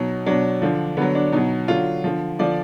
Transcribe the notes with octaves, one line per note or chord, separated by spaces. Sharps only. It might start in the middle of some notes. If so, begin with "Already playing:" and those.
Already playing: B2 F#3 D#4
B2 F#3 D4
D3 F3
D3 F#3 B3
D4
B2 F#3 D#4
D3 F#3 F4
D3 F3
D3 F3 D5